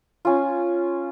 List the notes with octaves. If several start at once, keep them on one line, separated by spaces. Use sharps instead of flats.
C#4 F4